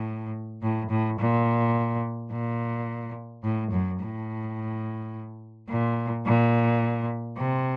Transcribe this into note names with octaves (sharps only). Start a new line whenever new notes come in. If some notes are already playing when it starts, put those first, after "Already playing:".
Already playing: A2
A2
A2
A#2
A#2
A2
F#2
A2
A#2
A#2
C3